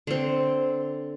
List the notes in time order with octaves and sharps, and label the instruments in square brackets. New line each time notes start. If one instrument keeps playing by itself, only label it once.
[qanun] D3 C4